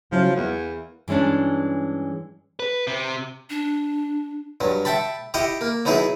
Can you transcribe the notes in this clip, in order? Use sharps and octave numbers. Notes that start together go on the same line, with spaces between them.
C#3 F3 F#3 E4
E2 A#3
G2 E3 G#3 C#4 D4
B4
C3
D4
G2 F#3
E5 F#5 G5 A5 B5
E4 G4 D#5 F#5
A#3
F#3 B3 D#4 E4 G#4